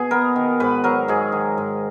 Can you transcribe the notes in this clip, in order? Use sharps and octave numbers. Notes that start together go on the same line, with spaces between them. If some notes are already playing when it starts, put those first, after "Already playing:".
Already playing: B2 G#4
B3 A#4
D#3
G#2 B4
F#3 A#4
G#2 G#4
D#3
G#2